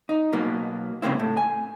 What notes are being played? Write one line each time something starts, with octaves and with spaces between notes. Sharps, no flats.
D#4
B2 F#3 A#3
G#2 C#3 A#3 C4 E4
A2
G#5